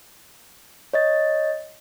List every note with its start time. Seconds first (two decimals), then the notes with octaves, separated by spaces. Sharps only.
0.94 C#5 D#5 A6